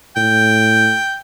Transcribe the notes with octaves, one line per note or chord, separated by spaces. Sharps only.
A2 G5